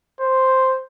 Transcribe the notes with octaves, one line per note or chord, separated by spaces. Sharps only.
C5